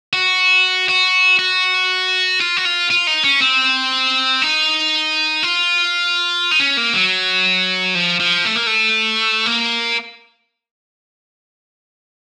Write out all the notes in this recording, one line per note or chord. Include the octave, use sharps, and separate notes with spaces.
F#4
F#4
F#4
F4
F#4
F4
F4
D#4
C#4
C4
D#4
F4
D#4
C#4
A#3
F#3
F3
F3
A3
A#3
A3
A#3